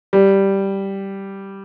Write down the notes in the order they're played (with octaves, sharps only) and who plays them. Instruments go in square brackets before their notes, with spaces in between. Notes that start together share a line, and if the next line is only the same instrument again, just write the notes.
[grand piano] G3